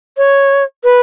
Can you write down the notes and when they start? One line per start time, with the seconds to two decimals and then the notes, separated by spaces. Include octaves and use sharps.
0.17 C#5
0.84 B4